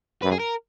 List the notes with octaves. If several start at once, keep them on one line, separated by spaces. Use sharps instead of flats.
F#2 B4
G#4
A#4